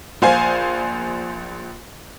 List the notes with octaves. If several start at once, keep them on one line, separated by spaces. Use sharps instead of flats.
A#1 C5 F5 G#5